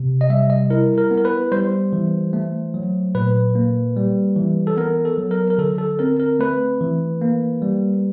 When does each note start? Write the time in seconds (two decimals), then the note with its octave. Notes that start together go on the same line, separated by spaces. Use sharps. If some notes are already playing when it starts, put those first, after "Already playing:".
Already playing: C3
0.21 D#5
0.30 G3 E5
0.50 D#5
0.70 E4 A#4
0.98 A#4
1.11 B3
1.17 A#4
1.25 B4
1.52 G3 C5
1.93 E3
2.33 A3
2.74 F#3
3.15 A#2 B4
3.55 A#3
3.97 G3
4.36 E3
4.67 A4
4.77 B3 A#4
5.05 A4
5.18 F#3
5.31 A#4
5.50 A#4
5.58 D3 A4
5.78 A4
5.99 C4 A#4
6.20 A#4
6.39 A3 B4
6.81 E3
7.21 A#3
7.62 G3